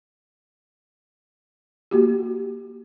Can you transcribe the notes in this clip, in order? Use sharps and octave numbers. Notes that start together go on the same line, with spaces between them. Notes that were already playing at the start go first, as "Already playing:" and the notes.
A#3 F#4 G4